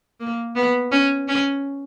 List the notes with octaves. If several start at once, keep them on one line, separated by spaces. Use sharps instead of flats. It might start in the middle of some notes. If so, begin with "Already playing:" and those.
A#3
B3
C#4
C#4